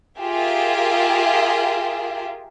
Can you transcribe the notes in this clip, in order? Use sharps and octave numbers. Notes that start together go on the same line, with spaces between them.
F4 G4 G#4 A#4 E5